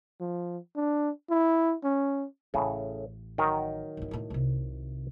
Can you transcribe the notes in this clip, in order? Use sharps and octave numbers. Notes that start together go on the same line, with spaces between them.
F3
D4
E4
C#4
A1 A2 C#3
D#3 F#3 A#4
G#2 E4
D2 A2
C2 C3